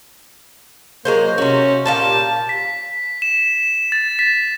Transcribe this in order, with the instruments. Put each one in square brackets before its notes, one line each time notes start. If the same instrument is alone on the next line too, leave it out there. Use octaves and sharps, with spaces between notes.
[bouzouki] F#3 G#3 C5 [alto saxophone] A#3
[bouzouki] C3 F#4 [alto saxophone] C#4
[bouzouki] A#2 G4 F5 [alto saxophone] A5
[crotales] B6
E7
A6
B6